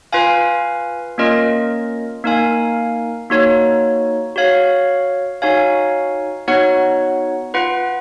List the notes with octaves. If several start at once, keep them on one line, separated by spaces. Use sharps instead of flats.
F4 B4 F5 G#5
A#3 C#4 F4 A#4 D#5
A#3 D#4 A#4 F5 G#5
A#3 D#4 F#4 C#5
F#4 C#5 F5
D#4 F#4 C#5 F5 G#5
B3 D#4 F#4 C#5 F#5
F4 B4 F#5